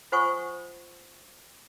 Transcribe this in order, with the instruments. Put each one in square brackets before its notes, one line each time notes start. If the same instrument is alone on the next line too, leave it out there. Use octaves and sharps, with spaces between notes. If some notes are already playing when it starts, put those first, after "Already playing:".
[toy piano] F4 C5 F#5 G#5 C#6 D#6